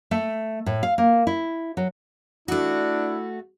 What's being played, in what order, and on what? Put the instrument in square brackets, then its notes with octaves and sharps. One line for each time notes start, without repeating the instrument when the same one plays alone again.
[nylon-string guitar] A3
A2
F5
A#3
E4
F#3
[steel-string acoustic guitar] A3 F#4 [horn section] D4 [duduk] E4